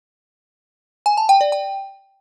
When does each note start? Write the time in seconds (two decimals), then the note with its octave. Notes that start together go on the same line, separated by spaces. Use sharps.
1.06 G#5
1.17 A5
1.29 G5
1.41 D5
1.52 G5